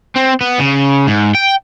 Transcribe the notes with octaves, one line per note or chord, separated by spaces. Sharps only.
C4
B3
C#3
G#2
G5